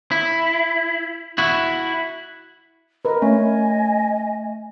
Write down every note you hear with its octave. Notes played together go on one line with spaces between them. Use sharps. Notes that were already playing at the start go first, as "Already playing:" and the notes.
E4
E4 F#4
A#4 B4 D#5
A3 C#4 D#5 G#5